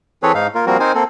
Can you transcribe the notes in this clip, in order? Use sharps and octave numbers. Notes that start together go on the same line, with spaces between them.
E3 C4 G#4 A4 B4 C#5
G#2 D#4 F5
A#3 F4 A#4
F3 G3 A#3 C4 F#4 A#4
C4 D#4 A#4 C5 G#5
A#3 C4 A4